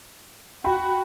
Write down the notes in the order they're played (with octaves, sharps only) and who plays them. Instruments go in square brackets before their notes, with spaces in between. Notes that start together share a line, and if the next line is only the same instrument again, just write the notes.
[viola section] F#4 [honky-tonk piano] G5 B5